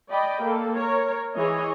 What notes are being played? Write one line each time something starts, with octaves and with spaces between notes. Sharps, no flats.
D5 D#5 G5 B5
A#3 A4
A#4 C#5
E3 G#4 C#5 D#5